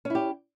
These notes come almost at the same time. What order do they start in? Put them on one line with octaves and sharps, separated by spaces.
C#4 E4 G4